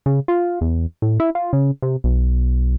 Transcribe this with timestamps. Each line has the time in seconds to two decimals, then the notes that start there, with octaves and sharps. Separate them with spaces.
0.06 C#3
0.28 F4
0.61 E2
1.02 A2
1.20 E4
1.35 F4
1.53 C#3
1.82 C3
2.04 B1